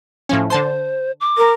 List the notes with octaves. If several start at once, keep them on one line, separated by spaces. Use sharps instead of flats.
A2 F3 C#4
D3 C5 A5 C6
D6
A#4